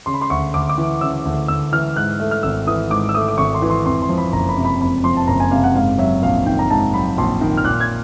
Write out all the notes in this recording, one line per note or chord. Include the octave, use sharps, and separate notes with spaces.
C#3 C6
B5
C6
D2 C#6
D2 D6
D6
E3
C#3 E6
D2
D2 E6
E3 F6
G#2 F#6
A3
F6
G#1 E6
E3 D#6
G#2 D6
E6
A3 D#6
D6
G#1 C#6
C6
E3
C6
F2 C6
C6
F3
B5
F#1 A#5
B5
C3
B5
F2 B5
F3 C6
A5
F#1 A#5
G#5
C3 F5
F#5
G#2 F5
F#3 E5
A#1 F5
D#3 G5
A#5
G#2 A5
F#3 B5
A#1 C6
D#3
F6
A#2 F#6
G#6